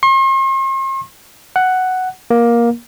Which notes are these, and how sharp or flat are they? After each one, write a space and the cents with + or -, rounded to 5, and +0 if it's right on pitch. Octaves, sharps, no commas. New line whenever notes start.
C6 +45
F#5 +5
A#3 +15